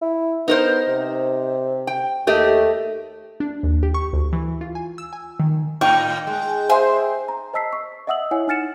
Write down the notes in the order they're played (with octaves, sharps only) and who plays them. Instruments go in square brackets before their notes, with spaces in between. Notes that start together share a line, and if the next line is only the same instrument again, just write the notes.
[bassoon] E4
[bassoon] B3 [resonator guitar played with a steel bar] D#4 A#4 C5
[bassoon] C3
[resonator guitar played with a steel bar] G5
[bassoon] D#2 [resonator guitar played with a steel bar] A3 G4 D#5
[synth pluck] D4
D#2
G4
C#6
D2
E3
F4
G#5
E6
G#5
D#3
[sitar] A2 A#3 D#4 [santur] G5 [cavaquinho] C#6
[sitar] G#3
[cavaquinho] G#4 E5 C6 [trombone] C5
[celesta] A#5
C5 D#5 A5 E6 B6 C7
C#6
D#5 E5 F#5 D#6 E6 F#7
E4 C#5 F#5 G#5
D#4 G#5 F6 A6 C#7 E7